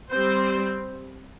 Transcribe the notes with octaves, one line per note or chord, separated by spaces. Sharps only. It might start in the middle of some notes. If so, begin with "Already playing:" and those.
G3 C4 C5